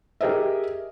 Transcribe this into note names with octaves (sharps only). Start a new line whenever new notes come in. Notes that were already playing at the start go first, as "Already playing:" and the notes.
G4 G#4 A#4 D#5 E5